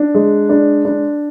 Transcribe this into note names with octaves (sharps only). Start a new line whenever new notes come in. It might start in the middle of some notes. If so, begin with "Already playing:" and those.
Already playing: D4
G#3
D4
D4